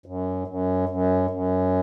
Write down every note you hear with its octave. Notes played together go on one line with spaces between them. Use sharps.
F#2
F#2
F#2
F#2